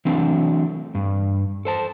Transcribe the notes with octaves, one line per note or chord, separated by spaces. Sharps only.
E3 F#3 A3 C4 D4
G2
A4 C5 A5